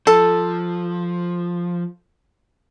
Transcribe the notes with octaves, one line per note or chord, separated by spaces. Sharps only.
F3 A4